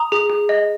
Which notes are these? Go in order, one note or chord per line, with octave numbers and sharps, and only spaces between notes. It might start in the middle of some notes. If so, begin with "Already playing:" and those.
Already playing: A#5 D#6
G#4
G#4
D#5